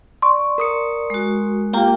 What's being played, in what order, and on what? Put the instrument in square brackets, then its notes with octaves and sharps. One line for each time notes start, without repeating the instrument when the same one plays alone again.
[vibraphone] D5 [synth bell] C6 C#6
[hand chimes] A#4 D#6 C#7
[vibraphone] G#3 F#4
[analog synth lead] A#3 [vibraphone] F4 G4 G5